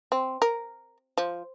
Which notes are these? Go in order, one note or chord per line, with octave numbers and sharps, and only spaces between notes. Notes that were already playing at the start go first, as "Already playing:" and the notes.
C4
A#4
F3